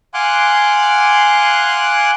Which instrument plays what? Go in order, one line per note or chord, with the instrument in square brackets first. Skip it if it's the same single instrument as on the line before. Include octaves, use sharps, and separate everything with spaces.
[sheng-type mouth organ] F5 F#5 G#5 C6 D6 F#6